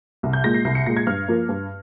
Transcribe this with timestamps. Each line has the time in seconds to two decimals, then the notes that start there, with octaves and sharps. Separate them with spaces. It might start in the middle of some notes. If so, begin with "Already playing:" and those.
0.23 C2
0.33 G6
0.44 A#2 G#3 A#6
0.54 C7
0.65 C2 C7
0.75 C#7
0.86 A#2 G#3 A#6
0.97 G#6
1.07 G2 F6
1.28 F3 A#3
1.49 G2